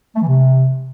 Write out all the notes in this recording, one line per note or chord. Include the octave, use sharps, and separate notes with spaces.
A3
E3
C3